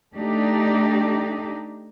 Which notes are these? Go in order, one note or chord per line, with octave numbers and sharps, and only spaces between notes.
A3 D4 D#4 G4